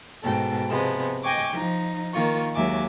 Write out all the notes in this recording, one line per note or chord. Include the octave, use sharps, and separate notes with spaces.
G#2 B2 A4 G5
C3 F3 G#3 B3
D#5 G5 G#5 C#6 D6
F3 D#4
D#3 A#3 F4 C#6
D#2 F#3 G#3 E5 G#5 D6